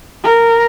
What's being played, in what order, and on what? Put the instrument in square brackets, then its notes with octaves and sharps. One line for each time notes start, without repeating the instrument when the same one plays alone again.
[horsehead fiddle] A#4